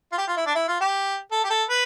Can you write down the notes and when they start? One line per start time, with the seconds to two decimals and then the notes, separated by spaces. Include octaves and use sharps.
0.12 F4
0.18 G4
0.27 F4
0.37 E4
0.46 D4
0.55 E4
0.68 F4
0.81 G4
1.32 A4
1.44 G4
1.50 A4
1.69 B4